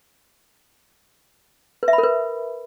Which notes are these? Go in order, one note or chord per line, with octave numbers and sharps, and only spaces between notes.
B4
E5
B5
A#4
B4